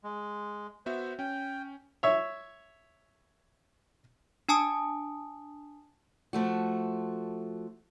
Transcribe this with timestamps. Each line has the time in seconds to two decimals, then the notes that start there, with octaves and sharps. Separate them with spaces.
0.04 G#3
0.86 B3 F#4 C5 E5
1.19 C#4 G5
2.03 C#5 E5
4.49 D4 G#5 A5 D#6
6.33 F3 A3 F#4